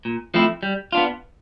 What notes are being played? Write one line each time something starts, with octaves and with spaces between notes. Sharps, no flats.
A#2
F3 A3 C4 E4
G3
B3 D4 F4